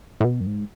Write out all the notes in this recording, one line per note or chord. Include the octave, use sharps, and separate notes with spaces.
A2
B2
F#2
G#2